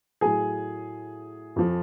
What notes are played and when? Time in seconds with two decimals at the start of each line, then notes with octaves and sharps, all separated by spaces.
0.21 A2 F#3 G#4 G#5
1.56 F2 F3